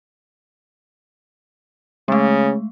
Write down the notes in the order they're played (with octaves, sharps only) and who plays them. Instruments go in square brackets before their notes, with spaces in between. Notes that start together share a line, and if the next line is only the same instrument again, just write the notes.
[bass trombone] C#3 [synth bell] G#3 A3